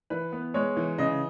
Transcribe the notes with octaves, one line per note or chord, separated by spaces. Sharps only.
E3 B4
B3
G#3 C#5
E3
C#3 D#5